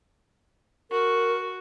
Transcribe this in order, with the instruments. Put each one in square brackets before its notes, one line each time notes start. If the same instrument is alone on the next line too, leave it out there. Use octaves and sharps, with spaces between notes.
[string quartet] F#4 [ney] A#4